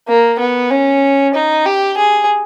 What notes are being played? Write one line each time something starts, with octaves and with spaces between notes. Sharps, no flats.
A#3
B3
C#4
D#4
G4
G#4